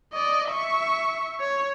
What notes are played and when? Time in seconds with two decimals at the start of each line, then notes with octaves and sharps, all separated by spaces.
0.13 D5 D#5
0.50 E5 C#6
1.40 C#5